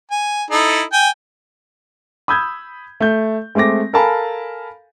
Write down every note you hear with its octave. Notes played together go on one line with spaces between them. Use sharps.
G#5
D#4 E4 A4
G5 G#5
B5 D#6 E6 G6 G#6
A3 G6
G#3 A3 C4 D6 A#6
A4 A#4 F5 G#5 A5 B5